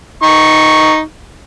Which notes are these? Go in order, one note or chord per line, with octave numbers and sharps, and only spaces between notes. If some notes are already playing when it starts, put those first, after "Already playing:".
D#4 C#6